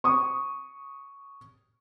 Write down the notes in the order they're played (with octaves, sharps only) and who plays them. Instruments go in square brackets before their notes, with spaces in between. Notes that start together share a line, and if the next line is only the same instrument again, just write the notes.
[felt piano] C#6 D#6